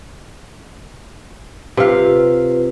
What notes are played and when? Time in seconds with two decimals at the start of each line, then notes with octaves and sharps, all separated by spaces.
1.77 C3 F4 B4 F5